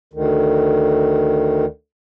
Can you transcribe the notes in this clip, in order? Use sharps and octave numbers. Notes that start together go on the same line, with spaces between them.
D2 D#3